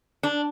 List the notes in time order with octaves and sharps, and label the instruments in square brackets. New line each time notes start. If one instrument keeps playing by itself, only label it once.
[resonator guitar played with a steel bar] D4